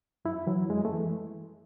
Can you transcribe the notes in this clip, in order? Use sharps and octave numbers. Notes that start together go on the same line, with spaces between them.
F#2 E4
E3 F#3
F#2 G#3
A3
E3